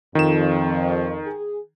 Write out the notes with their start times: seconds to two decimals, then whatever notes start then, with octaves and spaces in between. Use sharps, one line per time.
0.15 F2 D#3 E7
1.27 G#4